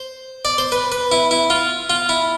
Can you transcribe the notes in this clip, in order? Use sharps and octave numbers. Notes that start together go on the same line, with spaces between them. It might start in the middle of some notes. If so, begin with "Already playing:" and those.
Already playing: C5
D5
C5
B4
B4
E4
E4
F4
F4
E4